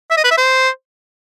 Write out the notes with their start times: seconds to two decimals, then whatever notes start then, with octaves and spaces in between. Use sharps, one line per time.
0.11 E5
0.17 D#5
0.24 B4
0.31 E5
0.38 C5